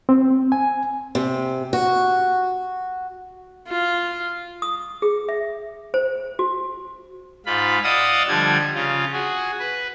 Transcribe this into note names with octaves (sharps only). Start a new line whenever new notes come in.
C4
G#5
C3
F#4
F4
D#6
G#4
E5
C5
F#4
G#2 F4 B5
D5 D#5 F5 F#5 D#6 E6
D3 F3 G3 D5 G#6
C#3 F4
F#4 G#4
B4